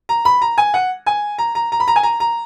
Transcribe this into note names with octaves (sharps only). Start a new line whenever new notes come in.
A#5
B5
A#5
G#5
F#5
G#5
A#5
A#5
A#5
B5
A#5
G#5
A#5
A#5